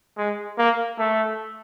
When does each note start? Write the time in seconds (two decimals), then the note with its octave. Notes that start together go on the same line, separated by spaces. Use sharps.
0.17 G#3
0.58 A#3
0.99 A3